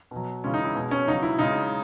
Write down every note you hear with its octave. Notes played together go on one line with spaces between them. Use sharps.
B2
F#3
C#3 E3 G#3 C#4
D#4
E4
B2 G#3
C#4
C#3 F#3 D#4
E4
C#3 G#3 D#4